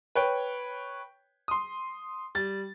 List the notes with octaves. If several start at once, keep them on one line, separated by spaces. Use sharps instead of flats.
B4 C#5 G5
C6 D#6
G3 A6